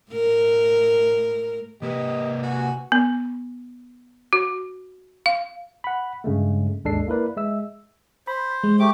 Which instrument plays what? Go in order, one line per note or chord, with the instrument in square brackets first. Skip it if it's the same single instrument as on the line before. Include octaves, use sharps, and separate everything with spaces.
[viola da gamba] A2 A#4
[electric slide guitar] C3 A#3 B4 [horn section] G4 D#5
[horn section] F#4 G#5
[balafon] B3
F#4
F5
[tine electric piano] F#5 B5
G2 C#3 G#3 A3
G#1 D#2 G#3 D4 A4 C7
A#3 E4 A#4 B4 D5
G#3 E5 E6
[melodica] C5 [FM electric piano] B5
[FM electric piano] G#3
[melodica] A3 G4 D6